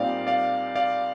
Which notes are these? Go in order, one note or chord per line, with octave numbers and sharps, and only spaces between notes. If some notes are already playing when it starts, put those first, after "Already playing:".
Already playing: A#2 G3 C4 D#4 D5 F5
D5 F5
D5 F5